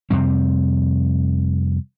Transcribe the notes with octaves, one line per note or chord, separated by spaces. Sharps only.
F2 C3 G3 C4